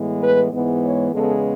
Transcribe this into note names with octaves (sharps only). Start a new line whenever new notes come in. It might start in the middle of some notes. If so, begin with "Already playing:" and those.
Already playing: A2 E3 G#3 B3
B4
G#2 E3 G#3 B3
C#5
E2 C#3 G#3 B3 A4